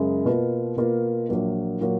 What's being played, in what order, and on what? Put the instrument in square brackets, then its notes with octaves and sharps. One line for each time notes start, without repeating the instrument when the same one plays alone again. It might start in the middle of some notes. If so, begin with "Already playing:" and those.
Already playing: [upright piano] F#2 C#3 G#3
B2 A#3 F4 B4
B2 A#3 F4 B4
A#1 A#2 F#3 A#3
A#2 F#3 A#3